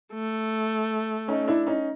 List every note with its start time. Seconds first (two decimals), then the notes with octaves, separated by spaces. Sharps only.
0.14 A3
1.28 C#4 D#4
1.48 D4 E4
1.67 C#4 D#4